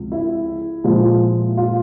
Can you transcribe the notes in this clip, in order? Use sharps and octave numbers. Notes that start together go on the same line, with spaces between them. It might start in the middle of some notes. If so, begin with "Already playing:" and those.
Already playing: C#2 C3 F3
E4
A#2 F3 G#3
F4